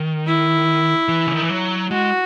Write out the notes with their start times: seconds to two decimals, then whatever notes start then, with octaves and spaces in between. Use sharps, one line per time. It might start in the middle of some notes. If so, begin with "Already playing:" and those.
Already playing: D#3
0.27 E4
1.08 E3
1.27 C#3
1.34 D#3
1.43 E3
1.50 F#3
1.91 G#3 F#4